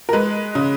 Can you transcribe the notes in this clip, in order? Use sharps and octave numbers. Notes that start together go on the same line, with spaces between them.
A#4
G#3 B4
C#3